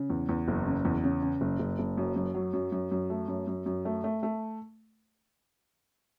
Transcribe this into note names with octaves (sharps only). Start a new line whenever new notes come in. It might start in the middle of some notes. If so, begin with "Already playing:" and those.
Already playing: C#3
E2
E2
F#1
C#3
E2
C#3
C#3
F#1
F#1
F#1
F#2
F#2
F#3
F#2
F#2
F#2
A3
F#2
F#2
F#2
A3
A3
A3